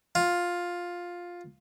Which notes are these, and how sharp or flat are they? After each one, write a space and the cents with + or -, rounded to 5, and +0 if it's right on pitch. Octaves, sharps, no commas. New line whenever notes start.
F4 +10